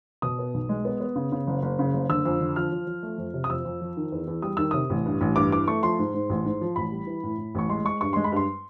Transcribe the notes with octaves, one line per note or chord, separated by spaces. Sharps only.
B2 D#6
B3
B1
G#3
B3
B3
C#3
C#3
F#1
F#1
C#3
F#1
D3 E6
F2
D3
F3 F6
F3
F3
A3
F2
C3
D#6
F2 E6
F2
F3
D#3
E2
E2
G3 D#6
D#3 E6
C3 D#6
A1
G2
A1
G2 D6
E3 D6
A3 C#6
F3 C6
G#2
G#2
A1
G#2
F3
A1 B5
G3
E3
A2
A2
A1 C#6
G#3 C6
G#3 C#6
G2 C#6
G#3 C6
B5
G2 C6